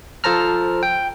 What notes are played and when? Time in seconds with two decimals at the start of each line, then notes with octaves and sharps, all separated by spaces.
0.24 F3 A4 C5 A5 A#5 F6
0.83 G5